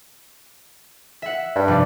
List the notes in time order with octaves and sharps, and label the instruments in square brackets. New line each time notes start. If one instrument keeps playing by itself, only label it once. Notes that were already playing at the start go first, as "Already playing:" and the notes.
[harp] E5 F#5
[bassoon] G2
[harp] F1 D5